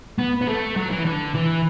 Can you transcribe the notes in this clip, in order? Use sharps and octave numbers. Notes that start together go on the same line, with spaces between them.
B3
B3
A3
F#3
E3
D3
E3